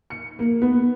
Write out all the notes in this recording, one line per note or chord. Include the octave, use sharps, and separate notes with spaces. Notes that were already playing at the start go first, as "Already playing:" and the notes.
C#7
A#3
B3